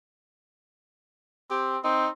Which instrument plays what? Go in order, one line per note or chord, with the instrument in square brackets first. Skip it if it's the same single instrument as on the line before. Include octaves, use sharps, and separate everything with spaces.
[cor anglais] C4 [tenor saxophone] G4
[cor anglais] C4 [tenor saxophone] D#4